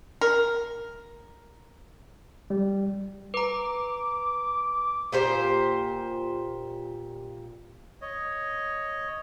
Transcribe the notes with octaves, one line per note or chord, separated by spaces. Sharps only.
A#4
G3
B4 A#5 D6
A#2 G4 C5
C#5 D#5